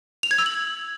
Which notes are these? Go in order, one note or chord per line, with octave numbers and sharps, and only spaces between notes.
F7
G#6
E6
F#7